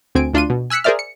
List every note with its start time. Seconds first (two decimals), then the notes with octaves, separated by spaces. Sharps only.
0.15 D2 C4 G#5 D7
0.34 D2 D4 F4 C6 D#7
0.50 B2
0.70 G#5 E6 F#6 B6 C#7
0.84 G#4 A#4 C5 D5 E5 F6
0.99 C#7